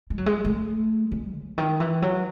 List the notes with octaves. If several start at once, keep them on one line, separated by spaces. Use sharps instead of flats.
G#3
F#3
G#3
A3
G#3
C#3
D#3
E3
F#3